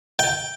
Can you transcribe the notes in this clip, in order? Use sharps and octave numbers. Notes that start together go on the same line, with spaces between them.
G5